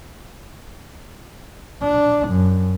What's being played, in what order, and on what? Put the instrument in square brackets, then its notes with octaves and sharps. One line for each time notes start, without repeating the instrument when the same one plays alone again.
[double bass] D4
F#2